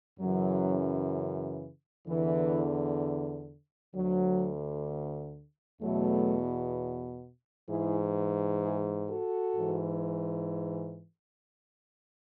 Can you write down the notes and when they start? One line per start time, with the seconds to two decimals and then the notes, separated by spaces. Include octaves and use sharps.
0.20 F#2 C#3 E3 F#3
2.07 E2 D3 E3
3.95 D2 D3 F#3
5.81 E2 B2 F#3 A3
7.68 G#2 E3 E4 G#4
8.61 E4 G#4
9.09 F#4 A4
9.56 G#2 E3